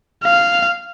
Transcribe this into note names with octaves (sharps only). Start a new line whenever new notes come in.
F5